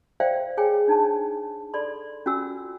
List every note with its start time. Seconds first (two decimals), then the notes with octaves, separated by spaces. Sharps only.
0.20 C5 D5 E5 F5 G5
0.57 G#4 C#5 G5 G#5
0.88 D4 D#4 G#5 A5
1.74 A4 D5 B5 C6
2.26 C#4 F4 F#4 G#5 E6